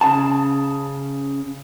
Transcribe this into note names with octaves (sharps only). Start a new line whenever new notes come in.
C#3 A5